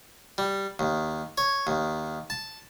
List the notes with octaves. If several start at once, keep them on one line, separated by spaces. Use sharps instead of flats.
G3
D#2
C#5
D#2
A5